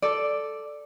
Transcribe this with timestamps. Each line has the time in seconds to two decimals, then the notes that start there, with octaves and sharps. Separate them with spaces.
0.02 A4 D5